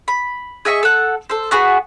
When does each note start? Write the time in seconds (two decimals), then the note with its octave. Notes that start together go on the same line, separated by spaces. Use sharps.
0.08 B5
0.65 G#4 D#5 E5 C#6
0.83 A4 F#5
1.30 A4 C5
1.51 B3 F#4 G#4 B4